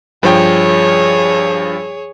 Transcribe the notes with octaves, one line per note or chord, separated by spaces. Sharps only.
G2 F3 G#4 C#5 G5